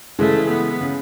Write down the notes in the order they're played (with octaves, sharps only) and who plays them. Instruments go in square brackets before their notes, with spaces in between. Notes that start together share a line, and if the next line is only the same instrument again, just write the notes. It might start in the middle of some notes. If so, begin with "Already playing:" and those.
[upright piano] C#3 E3 G#3 [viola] A3
[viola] B3
[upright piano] C#3